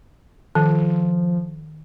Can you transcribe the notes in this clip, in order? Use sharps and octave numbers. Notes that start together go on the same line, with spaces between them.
D#3 F3